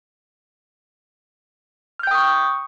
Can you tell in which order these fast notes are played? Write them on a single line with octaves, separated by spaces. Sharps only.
F6 G6 G5 D#6 C#6